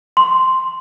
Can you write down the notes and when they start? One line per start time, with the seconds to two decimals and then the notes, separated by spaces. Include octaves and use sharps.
0.17 C6